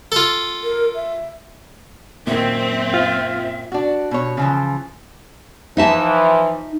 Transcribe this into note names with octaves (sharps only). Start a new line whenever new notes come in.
F4 A4
A#4
E5
F#2 A#2 D#3 C4 E5
F4
D4 F#4
B2 C#5
C#3 E3 F3
E3 F3 D#4 E5 A5